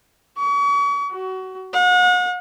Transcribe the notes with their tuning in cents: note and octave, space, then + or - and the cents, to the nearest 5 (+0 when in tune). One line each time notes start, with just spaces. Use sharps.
C#6 +40
F#4 +25
F#5 -40